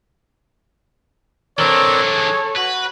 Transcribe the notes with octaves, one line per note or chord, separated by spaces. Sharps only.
E3 C4 D4 A4 A#4 C#5 D5
G#4
F#4 B4